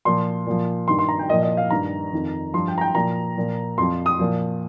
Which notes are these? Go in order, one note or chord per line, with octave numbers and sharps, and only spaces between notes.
A#2 F3 C6
A#2 F3
G2 D#3 C6
C6
A#5
G5
A#2 F3 D#5
D#5
F5
G2 D#3 A#5
F2 D#3
G2 F3 C6
G5
A#5
G5
A#2 F3 A#5
A#2 F3
F2 F3 C6
D#6
A#2 F3